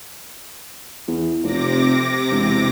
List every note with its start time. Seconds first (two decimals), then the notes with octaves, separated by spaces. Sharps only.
1.07 E2
1.43 F1 C3 D6 A#6
2.30 E1